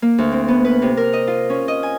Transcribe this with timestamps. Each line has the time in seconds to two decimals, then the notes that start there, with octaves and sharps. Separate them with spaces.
0.02 A#3
0.18 D2
0.32 C4
0.48 B3
0.65 B4
0.82 C3
0.97 A#4
1.13 D#5
1.27 F4
1.50 C#4
1.68 D#5
1.83 G#5